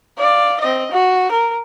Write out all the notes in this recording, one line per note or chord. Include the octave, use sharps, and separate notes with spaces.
D5 F5
C4 D#5
F#4
A#4